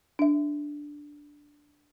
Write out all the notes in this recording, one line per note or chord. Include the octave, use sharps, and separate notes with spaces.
D4 E5